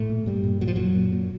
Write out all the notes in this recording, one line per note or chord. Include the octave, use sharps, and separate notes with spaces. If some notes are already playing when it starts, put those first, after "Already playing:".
Already playing: A2 A3
A#2
G2 A#2 G3
A#2
A#2 F#3
F3
F#2 A#2 F#3
A#2
A#2